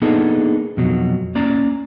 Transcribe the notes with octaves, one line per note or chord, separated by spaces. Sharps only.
A#3 B3 D4 D#4 G#4 A4
F2 B2 F#3
A#3 C#4 D5 A#5